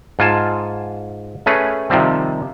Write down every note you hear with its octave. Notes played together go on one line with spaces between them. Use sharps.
G#2 F4 G#5 A5
A3 C#4 G#4 B4
C3 D#3 F3 G3 C4